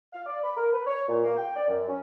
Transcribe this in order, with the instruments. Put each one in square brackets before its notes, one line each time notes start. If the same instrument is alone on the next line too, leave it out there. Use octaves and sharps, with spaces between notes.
[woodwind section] F5
D5
B5
A#4
B4
C#5
A#2
A#3
G5
D5
F#2
C#4